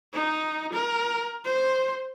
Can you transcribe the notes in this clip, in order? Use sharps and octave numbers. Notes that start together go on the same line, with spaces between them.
D#4
A#4
C5